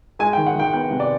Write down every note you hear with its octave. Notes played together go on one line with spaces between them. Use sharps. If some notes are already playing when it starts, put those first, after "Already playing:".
G#3 G#5
G5
D#3
F#5
D#3 G5
B3 G5
C3
D5